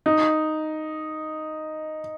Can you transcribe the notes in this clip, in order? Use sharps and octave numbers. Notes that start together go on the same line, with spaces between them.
D#4